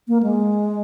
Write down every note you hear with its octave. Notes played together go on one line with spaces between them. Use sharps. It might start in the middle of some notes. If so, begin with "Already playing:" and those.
A#3
G#3